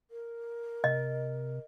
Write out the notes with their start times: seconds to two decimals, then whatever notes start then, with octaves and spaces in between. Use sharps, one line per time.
0.11 A#4
0.84 C3 D#5